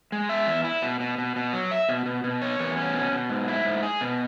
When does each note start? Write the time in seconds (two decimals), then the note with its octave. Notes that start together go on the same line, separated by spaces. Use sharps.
0.12 G#3
0.29 E5
0.47 E2
0.64 E4
0.82 B2
1.00 B2
1.18 B2
1.36 B2
1.53 F#3
1.71 E5
1.89 B2
2.06 B2
2.24 B2
2.42 C#5
2.59 E2
2.77 C#4
2.94 B2
3.12 B2
3.29 G#2
3.48 E4
3.65 G#2
3.83 G#4
4.01 B2